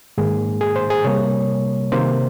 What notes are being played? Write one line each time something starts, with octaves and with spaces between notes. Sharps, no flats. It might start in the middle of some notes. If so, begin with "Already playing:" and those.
G#2 D#3 A#3 G#4
G#4
C5
G#4
C3 G3 A#3 C#5
C3 D#3 A#3 C5